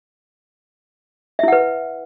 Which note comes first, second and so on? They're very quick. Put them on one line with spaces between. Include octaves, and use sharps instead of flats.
E5 E4 F#5 B4